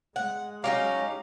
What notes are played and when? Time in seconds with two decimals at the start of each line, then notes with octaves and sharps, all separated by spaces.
0.16 G#3 F#5
0.64 F#3 C#4 D#4 F4 G4 F5 A#5